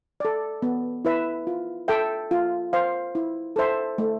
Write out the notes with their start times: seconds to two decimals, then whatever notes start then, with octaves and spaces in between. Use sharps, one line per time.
0.20 A4 D5
0.62 B3
1.05 E4 B4 E5
1.47 F4
1.88 A4 E5 G5
2.31 F4
2.73 C5 F5
3.15 E4
3.56 A4 C5 E5
3.98 A3